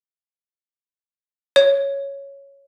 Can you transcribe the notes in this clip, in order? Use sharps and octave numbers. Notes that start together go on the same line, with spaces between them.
C#5